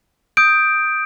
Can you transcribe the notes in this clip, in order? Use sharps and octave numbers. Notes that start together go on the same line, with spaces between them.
D#6 G6 D7